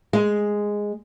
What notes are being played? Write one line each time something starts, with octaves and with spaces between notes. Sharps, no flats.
G#3